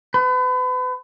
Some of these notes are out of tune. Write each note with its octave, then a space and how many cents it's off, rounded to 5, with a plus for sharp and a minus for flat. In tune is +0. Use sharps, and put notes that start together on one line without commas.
B4 +35